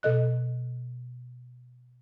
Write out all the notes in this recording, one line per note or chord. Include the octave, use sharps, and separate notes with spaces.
B2 A4 D#5 F#6